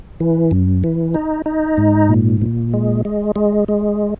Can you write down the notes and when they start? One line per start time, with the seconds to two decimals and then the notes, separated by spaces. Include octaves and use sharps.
0.20 E3
0.51 F#2
0.84 E3
1.14 D#4
1.46 D#4
1.78 G#2
2.09 A#2
2.42 A#2
2.74 G#3
3.05 G#3
3.36 G#3
3.68 G#3